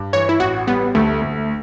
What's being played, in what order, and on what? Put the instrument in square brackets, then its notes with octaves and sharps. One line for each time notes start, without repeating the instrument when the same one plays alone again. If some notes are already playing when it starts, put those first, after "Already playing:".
Already playing: [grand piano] G2
[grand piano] E3 [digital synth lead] C#5
[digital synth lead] E4
[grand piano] A1 [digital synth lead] F#4
[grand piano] G3 [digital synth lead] B3
[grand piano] D2 [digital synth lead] A3
[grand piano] D2